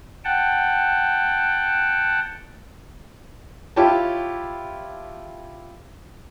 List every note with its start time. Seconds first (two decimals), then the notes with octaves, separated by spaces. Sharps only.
0.24 F#5 G5 A5
3.76 E4 F4 G4 C#5 G5 A5